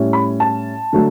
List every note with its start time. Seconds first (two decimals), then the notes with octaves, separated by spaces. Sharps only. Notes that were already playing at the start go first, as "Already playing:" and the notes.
Already playing: A2 G3 C#4 E4
0.13 B5
0.40 A5
0.93 D3 F#3 A3